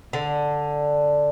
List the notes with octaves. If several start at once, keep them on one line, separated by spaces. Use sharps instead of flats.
D3